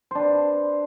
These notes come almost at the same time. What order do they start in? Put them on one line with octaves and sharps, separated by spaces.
C5 D4 B4